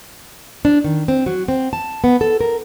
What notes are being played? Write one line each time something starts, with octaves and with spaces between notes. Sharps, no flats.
D4
D#3
C4
F#3
C4
A5
B3
A4
A#4